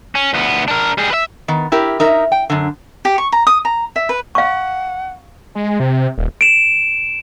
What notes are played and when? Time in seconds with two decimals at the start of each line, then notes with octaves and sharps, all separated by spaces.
0.15 C#4
0.34 D2 B3
0.68 D4 A#4
0.98 G3 G#4
1.10 B4 E5
1.48 D#3 B3
1.72 E4 G4 A#4
2.00 D#4 A#4 E5
2.32 G5
2.50 F#2 D3
3.05 G4
3.18 C#6
3.32 A#5
3.47 D#6
3.65 A#5
3.96 E5
4.09 B4
4.35 F5 F#5 C#6
5.55 G#3
5.80 C3
6.18 D#1
6.41 D7 E7